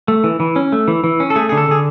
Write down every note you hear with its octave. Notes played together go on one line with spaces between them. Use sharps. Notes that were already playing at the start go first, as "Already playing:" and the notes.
A3
E3
E3
C#4
A3
E3
E3
C#4
A4
A3 G#4
G#4
D3
A4
D3 G#4